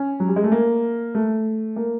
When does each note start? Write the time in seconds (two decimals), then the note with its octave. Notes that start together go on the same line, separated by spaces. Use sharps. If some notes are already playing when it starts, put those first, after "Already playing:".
Already playing: C#4
0.20 F#3
0.28 G3
0.36 G#3
0.44 A3
0.52 A#3
1.15 A3
1.76 A#3